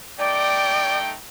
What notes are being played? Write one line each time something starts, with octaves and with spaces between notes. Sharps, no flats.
A3 D#4 D5 G5